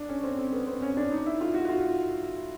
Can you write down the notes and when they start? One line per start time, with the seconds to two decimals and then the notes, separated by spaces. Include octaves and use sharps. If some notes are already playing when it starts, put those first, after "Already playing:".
Already playing: D4
0.09 C#4
0.23 C4
0.38 C4
0.53 B3
0.67 C4
0.82 C#4
0.97 D4
1.11 D#4
1.26 E4
1.41 F4
1.54 F#4
1.65 F#4
1.69 F4